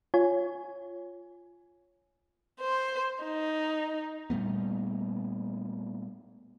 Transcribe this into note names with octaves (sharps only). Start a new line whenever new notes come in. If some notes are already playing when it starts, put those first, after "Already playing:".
F4 C#5 G#5
C5
D#4
A#2 G3 A3 B3